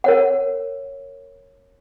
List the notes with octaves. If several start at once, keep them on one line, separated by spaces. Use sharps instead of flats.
A#4 C#5 F#5